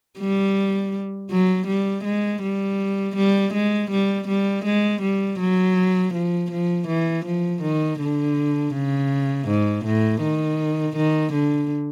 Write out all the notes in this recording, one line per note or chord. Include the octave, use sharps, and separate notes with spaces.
G3
F#3
G3
G#3
G3
G3
G#3
G3
G3
G#3
G3
F#3
F3
F3
E3
F3
D#3
D3
C#3
G#2
A2
D#3
D#3
D3